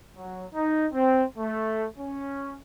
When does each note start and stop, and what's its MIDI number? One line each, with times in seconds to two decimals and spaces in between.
0.15 0.45 54
0.54 0.87 63
0.94 1.24 60
1.38 1.86 57
1.98 2.57 61